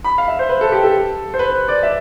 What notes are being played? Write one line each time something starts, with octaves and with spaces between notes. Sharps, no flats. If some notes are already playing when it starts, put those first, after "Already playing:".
B5
F5
E5
C5
B4
A4
G4
A4
C5
B4
D5
E5